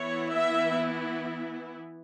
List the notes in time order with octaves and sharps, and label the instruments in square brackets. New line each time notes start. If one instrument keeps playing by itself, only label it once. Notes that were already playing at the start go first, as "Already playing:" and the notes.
Already playing: [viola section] E3 B3 E4 C#5
E5